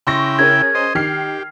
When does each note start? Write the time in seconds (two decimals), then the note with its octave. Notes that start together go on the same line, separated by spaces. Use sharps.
0.07 C#3 E4 G5 C6 C#6 A#6
0.39 C#4 G#4 A#4 G#6
0.75 C5 D#5
0.95 D#3 G4 F6 C7